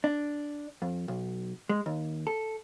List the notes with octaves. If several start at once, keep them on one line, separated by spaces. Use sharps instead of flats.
D4
F2
B1
G#3
D#2
A4